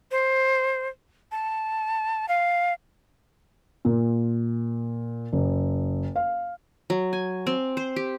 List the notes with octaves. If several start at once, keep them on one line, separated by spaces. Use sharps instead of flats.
C5
A5
F5
A#2
F#1
F5
F#3
G#5
C4
C5
G4